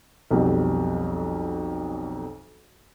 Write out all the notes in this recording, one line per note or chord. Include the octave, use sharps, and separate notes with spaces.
B1 F2 B2 G3